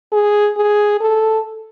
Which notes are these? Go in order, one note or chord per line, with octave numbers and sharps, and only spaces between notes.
G#4
G#4
A4